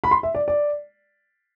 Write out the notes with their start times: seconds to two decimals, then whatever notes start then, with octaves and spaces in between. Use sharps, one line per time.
0.04 B5
0.11 C6
0.23 E5
0.35 D5
0.48 D5